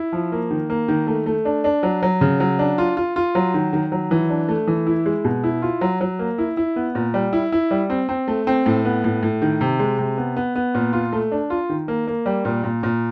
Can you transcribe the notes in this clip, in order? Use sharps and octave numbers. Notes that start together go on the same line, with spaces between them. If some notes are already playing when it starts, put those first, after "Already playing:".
Already playing: E4
F3
A#3
D#3
A#3
D#3
A3
A3
D4
D4
F#3
F#3
C#3
F#3
D4
F4
F4
F4
F#3
D#3
D#3
F#3
E3
D4
A3
E3
E4
G#3
B2
E4
F4
F#3
F#3
A#3
E4
E4
B3
A#2
G3
E4
E4
G3
C4
C4
A3
C4
A2
B3
A2
A2
D#3
C3
G#3
C3
B3
B3
B3
A#2
F4
A3
D4
F4
D#3
A#3
A#3
G3
A#2
A#2
A#2